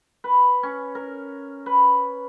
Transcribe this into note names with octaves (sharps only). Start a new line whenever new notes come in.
B4
C#4
A#4
B4